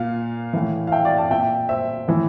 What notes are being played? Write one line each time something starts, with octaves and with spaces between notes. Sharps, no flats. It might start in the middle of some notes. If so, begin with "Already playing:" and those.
Already playing: A#2 F5
A2 E3
F5
E5 G5
D5 F5
F5 A5
A#2 E5 G5
C5 E5
A2 E3